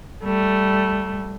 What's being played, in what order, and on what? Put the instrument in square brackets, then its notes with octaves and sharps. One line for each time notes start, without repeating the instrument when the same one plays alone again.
[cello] G3 [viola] A3